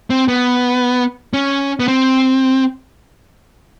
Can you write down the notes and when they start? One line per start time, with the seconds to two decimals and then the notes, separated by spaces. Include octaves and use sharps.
0.10 C4
0.28 B3
1.33 C#4
1.80 B3
1.88 C4